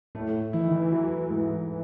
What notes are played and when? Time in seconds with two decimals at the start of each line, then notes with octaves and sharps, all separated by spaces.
0.15 A2 A3
0.53 E3 E4
0.68 D#3
0.73 E3
0.92 F#3
1.30 G#2